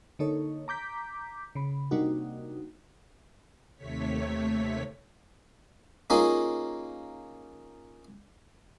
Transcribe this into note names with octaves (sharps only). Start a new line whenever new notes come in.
D3 A#3 D#4 A4 C#5
A#5 D6 G6 B6
C#3 B5
C3 G3 A#3 D4 D#4 F#4
D#2 C3 A3 C#5 B6
A#3 C#4 D#4 F4 G#4